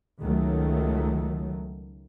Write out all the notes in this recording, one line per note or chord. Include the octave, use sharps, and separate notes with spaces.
C#2 D#3 F#3 A3